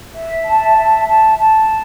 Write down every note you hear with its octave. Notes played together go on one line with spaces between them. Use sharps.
E5
A5
E5
A5
A5